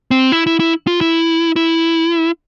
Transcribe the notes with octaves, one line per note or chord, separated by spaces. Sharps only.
C4
E4
E4
E4
F4
E4
E4